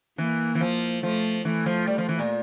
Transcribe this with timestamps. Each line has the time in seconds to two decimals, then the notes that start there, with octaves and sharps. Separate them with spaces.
0.18 E3 A#3
0.55 E3
0.61 F3
1.03 F3 A3
1.45 E3 A3
1.66 F3
1.87 G3
1.98 F3
2.09 E3
2.19 A#2